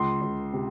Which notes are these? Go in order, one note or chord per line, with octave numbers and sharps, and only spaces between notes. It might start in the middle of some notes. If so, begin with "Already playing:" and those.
Already playing: C#2 C6
C#2
C3